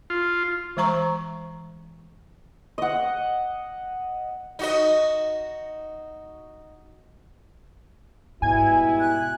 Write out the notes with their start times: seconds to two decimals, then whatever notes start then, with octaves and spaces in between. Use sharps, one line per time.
0.10 F4
0.77 E3 G#3 C5 A#5 C#6
2.78 D#5 F#5
4.59 D#4 F#4 D#5
8.42 G#2 B2 G3 E4 G#5 G#6
9.00 F#6